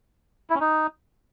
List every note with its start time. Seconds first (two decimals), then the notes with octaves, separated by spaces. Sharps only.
0.50 E4
0.55 C#4
0.60 D#4